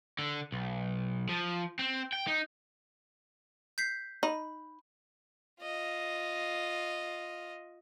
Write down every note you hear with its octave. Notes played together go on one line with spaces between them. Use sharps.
D3
B1
F3
C4
G5
D#4
G6 B6 C7
D#4 B5
F4 D#5